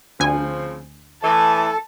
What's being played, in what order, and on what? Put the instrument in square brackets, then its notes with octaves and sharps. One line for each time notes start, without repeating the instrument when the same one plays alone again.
[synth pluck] D2 G#5 [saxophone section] C#3 F3 C4
[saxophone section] A2 E3 [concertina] A4 [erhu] A5